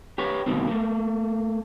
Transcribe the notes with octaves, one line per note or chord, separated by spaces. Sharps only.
G4 B4 C#5
D2 G2 B2 D#3 C4
A3 A#3